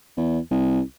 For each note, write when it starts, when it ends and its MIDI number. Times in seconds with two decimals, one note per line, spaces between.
0.17 0.39 40
0.51 0.81 36